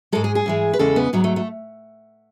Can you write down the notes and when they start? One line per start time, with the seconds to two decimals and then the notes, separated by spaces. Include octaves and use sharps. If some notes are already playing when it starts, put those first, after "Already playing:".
0.12 G#2 G#3 A4
0.24 G#4
0.35 G#4
0.46 G#2 E3 G#3
0.73 B4
0.79 E2 C#3 E3 G#3 A4
0.96 B3
1.13 G#2 F#3 B3
1.24 A3
1.36 A3